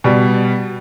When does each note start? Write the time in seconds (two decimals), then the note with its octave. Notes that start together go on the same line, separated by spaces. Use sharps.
0.04 B2 G3